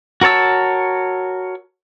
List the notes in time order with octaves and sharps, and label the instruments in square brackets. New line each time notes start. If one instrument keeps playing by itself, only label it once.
[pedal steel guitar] F#4 A#4 C#5 A5 E6